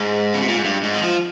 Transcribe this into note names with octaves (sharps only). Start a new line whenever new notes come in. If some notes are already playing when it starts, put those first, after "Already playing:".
Already playing: G#2
C#3
C3
A#2
G#2
G2
G#2
D#3
F3